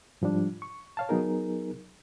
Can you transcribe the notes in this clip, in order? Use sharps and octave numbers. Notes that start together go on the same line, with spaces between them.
G#2 F3 G3 D4
C#6
C#5 F5 A5
F#3 B3 D#4 G#4 A#4